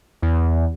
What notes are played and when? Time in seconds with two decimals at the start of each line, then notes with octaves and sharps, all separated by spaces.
0.22 E2